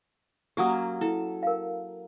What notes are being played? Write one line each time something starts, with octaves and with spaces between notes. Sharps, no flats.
F#3 A#3 C#4 G4 D#6
E4 A4
A#4 F5